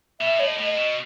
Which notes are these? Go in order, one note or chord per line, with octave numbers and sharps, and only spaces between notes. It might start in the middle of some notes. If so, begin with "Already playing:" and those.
B2 E5
A2 C#5
D#5
A2
D#5
B2